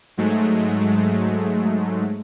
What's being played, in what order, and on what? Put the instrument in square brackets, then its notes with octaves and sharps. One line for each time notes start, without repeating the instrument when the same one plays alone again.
[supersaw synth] G#2 F#3 G#3 A3